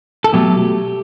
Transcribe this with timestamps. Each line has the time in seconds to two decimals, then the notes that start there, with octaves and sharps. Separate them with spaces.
0.24 A4
0.33 B2 F#3 A3 G4